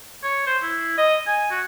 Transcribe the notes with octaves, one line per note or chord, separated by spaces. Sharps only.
C#5
C5
E4
D#5
G#5
F#4